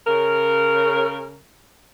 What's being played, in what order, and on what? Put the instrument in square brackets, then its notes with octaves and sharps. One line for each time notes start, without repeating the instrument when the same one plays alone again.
[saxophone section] C#3 A#4